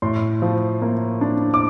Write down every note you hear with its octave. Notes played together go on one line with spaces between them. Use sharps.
A2 C6
F3
A#3
D4
D6